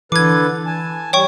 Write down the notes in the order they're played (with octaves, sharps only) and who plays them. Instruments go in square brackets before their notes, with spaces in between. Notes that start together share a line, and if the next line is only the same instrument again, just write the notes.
[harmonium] D3 A4 B4 [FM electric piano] E3 [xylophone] D6 G#6
[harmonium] G#5 A5
[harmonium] G3 [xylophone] C#5 G5 C#6